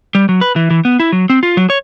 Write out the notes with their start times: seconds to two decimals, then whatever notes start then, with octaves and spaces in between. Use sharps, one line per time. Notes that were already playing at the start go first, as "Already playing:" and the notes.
0.15 G3
0.29 F#3
0.41 B4
0.56 E3
0.70 E3
0.85 B3
1.00 E4
1.12 F#3
1.30 C4
1.43 F4
1.57 F#3
1.70 C#5